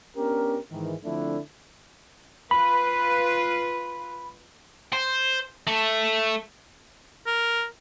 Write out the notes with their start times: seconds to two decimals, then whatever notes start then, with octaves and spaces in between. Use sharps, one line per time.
0.17 B3 C#4 D4 G4 A#4
0.71 G#2 D#3 E3
1.04 D3 F3 A3 C4 D4 E4
2.51 F4 B4 B5
4.93 C5
5.67 A3 A4
7.26 A#4